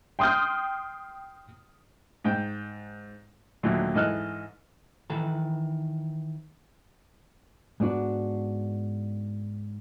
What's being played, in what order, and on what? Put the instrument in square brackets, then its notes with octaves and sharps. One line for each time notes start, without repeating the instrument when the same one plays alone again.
[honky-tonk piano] G5 C6 D#6 F6 G6
[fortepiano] G#2 G5
D#2 A#2 D3 F#3 A3
G#2 E3 A4 D#5 F6 F#6
[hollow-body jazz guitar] D#3 E3 A4 B4
G#2 B3 D4 F#4